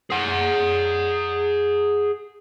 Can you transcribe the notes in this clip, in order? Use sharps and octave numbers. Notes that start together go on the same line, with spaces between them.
G#4 F#5